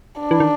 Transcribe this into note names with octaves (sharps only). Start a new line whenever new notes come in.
D4
E3
D#3